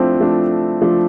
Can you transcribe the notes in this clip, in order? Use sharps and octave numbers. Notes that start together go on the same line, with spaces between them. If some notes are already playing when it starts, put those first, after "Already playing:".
Already playing: F3 A3 C4 D4 E4
F3 A3 D4
F3 A3 D4